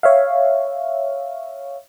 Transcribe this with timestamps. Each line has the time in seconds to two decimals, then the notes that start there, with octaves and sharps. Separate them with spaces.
0.03 C#5 E5 F5